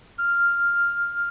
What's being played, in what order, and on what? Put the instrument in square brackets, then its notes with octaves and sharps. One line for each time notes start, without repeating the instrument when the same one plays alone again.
[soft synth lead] F6